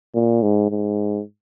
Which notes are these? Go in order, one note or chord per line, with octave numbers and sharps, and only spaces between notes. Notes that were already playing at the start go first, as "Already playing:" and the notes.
A#2
G#2
G#2